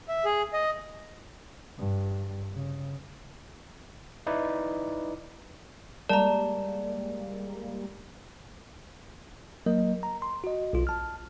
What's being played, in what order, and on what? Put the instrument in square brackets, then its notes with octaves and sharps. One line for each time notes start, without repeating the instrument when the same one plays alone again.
[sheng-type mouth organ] E5
G#4
D#5
[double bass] G2
C#3
[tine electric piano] D#4 E4 B4 D5
[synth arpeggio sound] G3 G#3 A#3 [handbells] D5 [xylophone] A5 A#5
[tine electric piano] F#3 A#3 A#4 D#5
A#5
C6
F#4 D#5
B1 F4
A5 F6